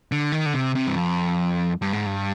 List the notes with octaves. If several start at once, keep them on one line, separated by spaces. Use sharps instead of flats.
D3
D#3
D3
C3
C3
G2
F2
G2
G#2
G2